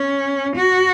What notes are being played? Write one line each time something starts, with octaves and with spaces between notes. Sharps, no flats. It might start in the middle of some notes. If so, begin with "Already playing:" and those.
Already playing: C#4
F#4